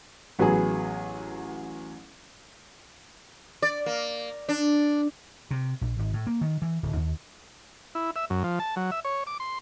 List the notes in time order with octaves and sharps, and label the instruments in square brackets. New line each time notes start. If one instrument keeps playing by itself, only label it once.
[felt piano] A1 F#3 B3 G#4
[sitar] D5
A#3
D4
[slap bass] C3
A#1
G#1
A2
A#3
D#3
E3
D1
D#2
[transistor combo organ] E4
E5
F#2
F3
A5
F#3
E5
C#5
D6
C6